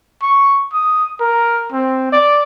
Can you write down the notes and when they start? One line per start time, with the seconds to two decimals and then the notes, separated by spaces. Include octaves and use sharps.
0.22 C#6
0.73 D#6
1.20 A#4
1.72 C4
2.12 D5